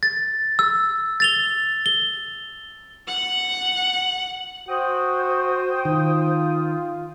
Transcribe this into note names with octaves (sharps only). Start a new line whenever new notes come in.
A6
E6
A6 F7 G7
G7
F#5 F#6
F#4 C5 G5 D#6
D#3 F4